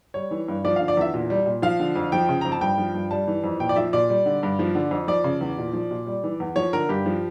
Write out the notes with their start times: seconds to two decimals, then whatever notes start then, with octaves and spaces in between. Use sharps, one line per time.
0.14 G3 C#5
0.31 E3
0.48 G2
0.64 F3 D5
0.76 D3 F5
0.88 D5
0.97 E2 E5
1.14 A#2
1.30 G3
1.46 A#2
1.62 F3 F5
1.80 D3
1.96 F2
2.12 F3 G5
2.29 C#3
2.41 F2 A#5
2.52 A5
2.61 G2 G5
2.78 F3
2.95 G2
3.11 G3 A5
3.28 E3
3.44 F2
3.60 A#2 G5
3.69 D5
3.76 F3 E5
3.93 A#2 D5
4.09 G3
4.26 D3
4.43 G2
4.59 F3
4.75 D3
4.91 F2
5.07 F3 D5
5.24 C#3
5.41 E2
5.58 A#2
5.73 F3
5.91 A#2
6.06 G3
6.24 E3
6.40 E2
6.56 F3 C#5
6.73 D3 A#4
6.89 G2 G4
7.06 F3